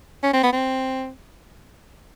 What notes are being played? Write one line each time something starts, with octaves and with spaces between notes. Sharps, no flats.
C#4
C4
B3
C4